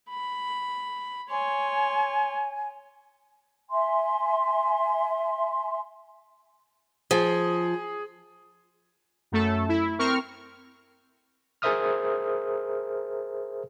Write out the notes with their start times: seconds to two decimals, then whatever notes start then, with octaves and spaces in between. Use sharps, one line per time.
0.10 B5
1.30 C#5 G#5 C6
3.71 E5 G#5 C6
7.11 F3 G#4
9.32 F#2 A3 A4
9.69 E4
9.99 C4 A#4 C#6 F6
11.62 G#4 A#4 C5 E5 D#6 F6